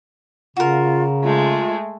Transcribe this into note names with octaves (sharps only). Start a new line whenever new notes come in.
C#3 F4 F#4 A#4
G#3 A3 F4